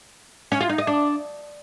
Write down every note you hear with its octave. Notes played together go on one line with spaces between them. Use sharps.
C#4
F4
D#4
D#5
D4